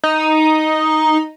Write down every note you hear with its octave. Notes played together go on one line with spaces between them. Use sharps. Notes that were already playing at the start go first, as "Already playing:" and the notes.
D#4